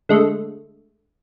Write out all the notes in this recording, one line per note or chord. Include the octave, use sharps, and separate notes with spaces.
D3 G#3 A3